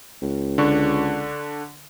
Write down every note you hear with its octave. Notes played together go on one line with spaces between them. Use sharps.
C#2
D3 D4 C#6